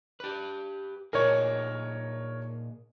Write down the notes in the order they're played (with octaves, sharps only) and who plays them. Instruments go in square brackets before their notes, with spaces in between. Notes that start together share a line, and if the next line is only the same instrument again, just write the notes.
[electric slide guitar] G4 B4
[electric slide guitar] A#2 D#4 G#4 [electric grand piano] A#4 C#5